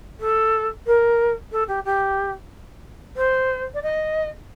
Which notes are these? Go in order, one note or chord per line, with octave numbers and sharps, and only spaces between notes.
A4
A#4
A4
G4
G4
C5
D5
D#5